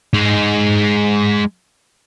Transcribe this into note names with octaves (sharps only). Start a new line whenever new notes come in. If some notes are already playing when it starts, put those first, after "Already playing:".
G#3 D#4